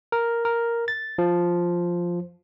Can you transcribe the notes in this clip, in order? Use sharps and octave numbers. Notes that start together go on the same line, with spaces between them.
A#4
A#4
A6
F3